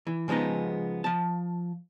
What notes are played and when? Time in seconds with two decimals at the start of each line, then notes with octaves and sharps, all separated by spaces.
0.07 E3
0.28 C#3 F3 G#3 B3 D#4
1.04 F3 A5